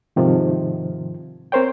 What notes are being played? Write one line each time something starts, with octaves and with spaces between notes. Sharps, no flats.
G#2 C3 D#3 F3
C4 A#4 C5 C#5 G5